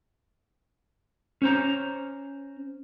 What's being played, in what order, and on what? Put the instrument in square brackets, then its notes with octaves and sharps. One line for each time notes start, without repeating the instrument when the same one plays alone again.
[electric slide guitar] C#4 C5 A#5